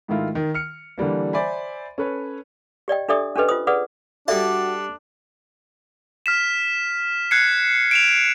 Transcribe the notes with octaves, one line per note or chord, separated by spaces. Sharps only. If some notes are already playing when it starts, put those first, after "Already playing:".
G#2 D#3 A3 E4 F4
D#3
F6 C#7
D3 E3 G3 A#3
C5 D5 E5 G#5 B5
C#4 A4 B4 C#5
G4 D5 D#5 G5
D4 G4 A4 D5 E5 D#6
C#4 D4 G4 A4 B4 D#5
F4 C5 D#6
G#4 B4 D5 F#5 D#6
G3 D4 F#4 A4 D5 E5 A5
F6 B6 E7
F#6 G#6 C7 C#7
D7 E7 F7